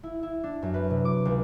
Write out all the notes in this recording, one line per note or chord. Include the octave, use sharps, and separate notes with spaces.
E4
E4
D4
F#2
B4
C3
D6
C#2